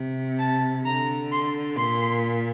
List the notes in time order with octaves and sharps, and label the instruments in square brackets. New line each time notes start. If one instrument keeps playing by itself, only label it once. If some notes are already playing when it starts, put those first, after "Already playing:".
Already playing: [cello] C3
[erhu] A5
[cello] D3 [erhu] A#5
[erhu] C6
[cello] A#2 [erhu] C6